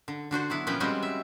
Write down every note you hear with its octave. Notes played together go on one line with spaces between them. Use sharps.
D3
D3 D4 F#4 C5
F#3 B3 E4
A#2 F3 C#4 B4 G5
G3 G#3 C4 C#4 F#4
E5